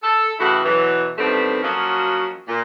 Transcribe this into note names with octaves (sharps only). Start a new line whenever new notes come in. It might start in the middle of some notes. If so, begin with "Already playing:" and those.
A4
A2 C#3 E3 E4 F#4
B2 E3 F#3
D3 D#3 G3 A3 B3 C4
F3 F#3 A#3 C#4 F#4 D#5
A#2